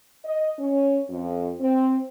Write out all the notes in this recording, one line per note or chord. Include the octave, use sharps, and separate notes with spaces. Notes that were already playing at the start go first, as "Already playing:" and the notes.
D#5
C#4
F2
C4